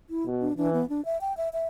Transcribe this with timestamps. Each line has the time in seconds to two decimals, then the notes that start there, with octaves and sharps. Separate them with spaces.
0.10 E4
0.26 B2
0.41 D4
0.57 E3 D4
0.73 B3
0.89 D4
1.05 E5
1.21 G5
1.37 E5
1.53 E5